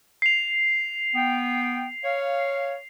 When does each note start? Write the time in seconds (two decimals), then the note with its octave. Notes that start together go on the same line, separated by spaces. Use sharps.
0.22 C7 F7
1.15 B3 G5
2.04 C#5 F5